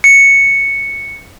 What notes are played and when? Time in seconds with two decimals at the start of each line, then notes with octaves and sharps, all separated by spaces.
0.04 C#7